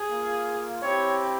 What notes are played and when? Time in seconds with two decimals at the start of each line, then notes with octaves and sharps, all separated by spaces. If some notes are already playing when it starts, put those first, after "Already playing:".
Already playing: G#4
0.09 A#3 F4
0.82 C4 E4 G4 C#5